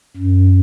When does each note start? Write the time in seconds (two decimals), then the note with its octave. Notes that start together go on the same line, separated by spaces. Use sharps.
0.16 F#2